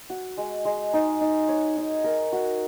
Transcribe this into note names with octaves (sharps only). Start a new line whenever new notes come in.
F#4
G#3
G#3
D#4
D#4
C#5
D#4
A#4
F#4